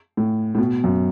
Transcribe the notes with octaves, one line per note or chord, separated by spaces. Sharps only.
A2
A2
B2
F#2